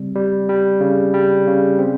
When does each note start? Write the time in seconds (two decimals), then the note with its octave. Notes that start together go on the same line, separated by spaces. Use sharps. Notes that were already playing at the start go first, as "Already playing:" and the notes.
Already playing: C#3 G3 C4
0.15 G3
0.49 G3
0.81 C#3
1.14 G3
1.47 C#3
1.79 C4